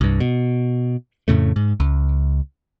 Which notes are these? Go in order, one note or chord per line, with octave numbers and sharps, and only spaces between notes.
C2 G2
B2
F2 A2 C#3 A3
G#2
C#2